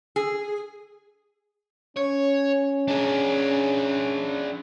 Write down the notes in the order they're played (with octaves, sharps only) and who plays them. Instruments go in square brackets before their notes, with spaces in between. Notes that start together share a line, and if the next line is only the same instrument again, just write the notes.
[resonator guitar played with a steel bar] G#4
[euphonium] C#4 [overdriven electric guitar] C#5
[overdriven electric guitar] D4 G#4